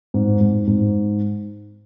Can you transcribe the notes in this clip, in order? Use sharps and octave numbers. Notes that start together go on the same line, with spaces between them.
G#2
G#2
G#2